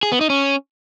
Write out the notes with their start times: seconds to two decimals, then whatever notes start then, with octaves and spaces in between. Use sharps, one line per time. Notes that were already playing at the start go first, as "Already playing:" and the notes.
0.03 G#4
0.12 B3
0.21 D#4
0.30 C#4